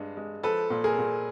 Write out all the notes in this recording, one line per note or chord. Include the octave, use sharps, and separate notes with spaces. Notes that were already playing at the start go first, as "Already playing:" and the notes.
Already playing: G2 G#3
G#3
F3 A4 B4
A#2
G#4 A#4
A#2